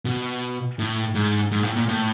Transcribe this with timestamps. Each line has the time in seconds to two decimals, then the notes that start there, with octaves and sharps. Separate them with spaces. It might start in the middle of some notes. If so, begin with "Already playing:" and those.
0.05 B2
0.79 A2
1.15 G#2
1.52 G#2
1.63 A2
1.76 A#2
1.88 A2